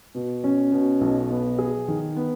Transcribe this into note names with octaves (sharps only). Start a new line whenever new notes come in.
B2
C#4
B2
B1
B3
G#4
D#3
B3